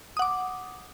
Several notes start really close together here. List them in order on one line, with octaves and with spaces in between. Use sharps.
D#6 F#5 D6